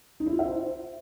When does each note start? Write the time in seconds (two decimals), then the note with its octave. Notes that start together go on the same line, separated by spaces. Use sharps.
0.20 D#4
0.26 E4
0.33 F4
0.39 E5
0.45 C5